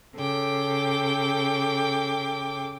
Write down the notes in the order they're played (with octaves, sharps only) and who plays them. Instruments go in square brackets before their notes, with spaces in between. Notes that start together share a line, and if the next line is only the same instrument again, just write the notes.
[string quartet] C#3 A4 G5 D6